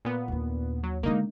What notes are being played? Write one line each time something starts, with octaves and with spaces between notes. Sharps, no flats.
A#2 B3
D#2 D4
F#3
D3 G#3 A#3 D#4